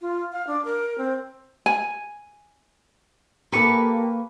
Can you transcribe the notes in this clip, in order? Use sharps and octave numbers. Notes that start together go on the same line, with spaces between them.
F4
F5
D4
A#4
C4
G#5
A#3 G4 A4 B4 B5 C#6